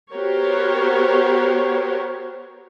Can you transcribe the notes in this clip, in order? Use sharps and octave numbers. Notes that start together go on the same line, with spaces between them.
B3 F#4 G4 A#4 C5 C#5